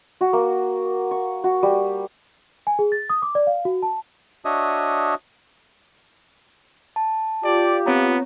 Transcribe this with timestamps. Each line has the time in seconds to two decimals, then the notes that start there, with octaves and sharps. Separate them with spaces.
0.21 F#4
0.33 A#3
1.11 C#6
1.44 F#4
1.63 G3
2.67 G#5
2.79 G#4
2.92 A6
3.10 D#6
3.22 D6
3.35 D5
3.47 F5
3.65 F#4
3.82 A5
4.45 D4 F#4 C#5 D#5 E5 D#6
6.96 A5
7.44 F4 G4 D5
7.86 B3 C4 C#5 A#5